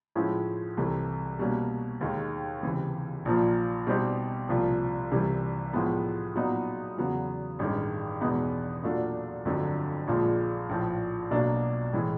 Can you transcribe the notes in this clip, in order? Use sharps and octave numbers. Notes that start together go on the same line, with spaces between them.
A2 F3 G#3 C#4 E4
C2 C3 E3 A3
B2 G3 A#3 C#4
D#2 D#3 G#3
C#2 C3 E3
A#1 A#2 F3 A#3
B2 G3 C4 D#4 G4
C2 A#2 F3
C2 C3 E3 G3
A2 F3 G#3 B3
A#2 F#3 B3 D#4
E2 C#3 F#3 B3
A1 G2 D#3 G#3 C#4
E2 B2 G#3 B3 D#4
A#2 F#3 A3 D4 F#4
G1 F2 D3 F#3 A3
A#1 A#2 F3 G#3
A#1 A2 F3
B1 B2 F#3 A#3 D4
A2 E3 G#3